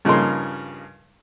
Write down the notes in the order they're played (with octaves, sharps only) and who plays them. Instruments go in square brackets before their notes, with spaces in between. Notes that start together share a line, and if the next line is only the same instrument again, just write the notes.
[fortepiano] G2 C#3 F3 D#4 A#4 C6